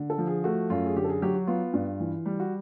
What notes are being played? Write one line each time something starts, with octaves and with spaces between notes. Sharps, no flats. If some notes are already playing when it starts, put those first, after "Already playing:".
Already playing: D3
A4
F3
G#4
A3 F#4
F#2 F4
G#4
D3 G4
A4
G#4
F#3 G4
F#4
B3 F4
G2
E3
G3
F#4